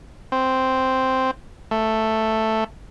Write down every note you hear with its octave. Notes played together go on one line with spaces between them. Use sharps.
C4
A3